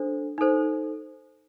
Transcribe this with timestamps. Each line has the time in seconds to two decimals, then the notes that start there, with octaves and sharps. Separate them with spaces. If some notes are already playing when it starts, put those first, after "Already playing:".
Already playing: D4 A4 C5
0.38 D#4 A4 C5